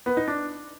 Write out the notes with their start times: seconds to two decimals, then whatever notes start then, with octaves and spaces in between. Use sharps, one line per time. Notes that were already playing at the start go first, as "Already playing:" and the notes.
0.06 B3
0.17 D#4
0.28 D4